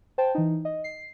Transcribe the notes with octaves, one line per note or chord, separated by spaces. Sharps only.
C5 G5 A5
E3 D#4
D#5
C7